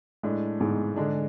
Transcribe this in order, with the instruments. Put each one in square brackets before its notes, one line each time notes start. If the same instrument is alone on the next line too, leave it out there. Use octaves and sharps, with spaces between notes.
[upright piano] A2 G#3 D4
[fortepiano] G#2
[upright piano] D3 G#3 D4